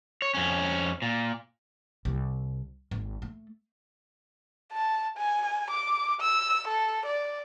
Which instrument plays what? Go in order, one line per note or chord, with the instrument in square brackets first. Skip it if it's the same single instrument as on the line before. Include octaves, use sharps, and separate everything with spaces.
[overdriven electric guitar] C#5
F2 C#4
A#2
[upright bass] C2
G#1
A3
[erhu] A5
G#5
D6
E6
A4
D5